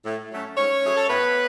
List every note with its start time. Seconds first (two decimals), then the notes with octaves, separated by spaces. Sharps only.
0.06 A2
0.31 F#3 A3 C#4
0.57 G#2 C#4 C#5
0.83 F#3 A3 G#4
0.96 A4
1.08 A2 B3 B4